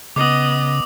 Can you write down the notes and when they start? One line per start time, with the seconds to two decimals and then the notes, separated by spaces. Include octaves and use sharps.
0.16 C#3 B3 D#5 D6 D#6